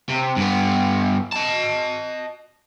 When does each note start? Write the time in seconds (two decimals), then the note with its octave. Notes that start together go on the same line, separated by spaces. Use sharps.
0.10 C3
0.37 G2 B3
1.33 D#5 A5